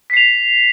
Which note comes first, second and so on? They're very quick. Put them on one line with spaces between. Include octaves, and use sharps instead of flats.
B6 C7 F7